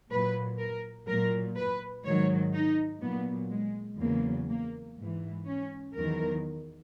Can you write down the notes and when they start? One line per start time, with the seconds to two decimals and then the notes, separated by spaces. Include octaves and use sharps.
0.10 A#2 F#3 B4
0.59 A#4
1.08 A#2 F#3 A#4
1.57 B4
2.05 G#2 D#3 F#3 C#5
2.54 D#4
3.02 A#2 F#3 B3
3.51 G#3
3.99 E2 C#3 F#3 A#3
4.49 A#3
4.97 G#2 E3
5.47 C#4
5.95 E2 D#3 F#3 A#4